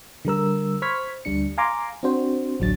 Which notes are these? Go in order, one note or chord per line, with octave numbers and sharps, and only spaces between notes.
D3 G3 A#4 E6
C5 B5 C#6 F6 G#6 B6
D2 G3 D4 C#7
F5 G#5 A#5 C6 D6
C4 D4 F#4 C5
A1 D2 F#3 D4 A6